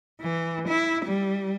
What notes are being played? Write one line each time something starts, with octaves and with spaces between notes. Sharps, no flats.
E3
E4
G3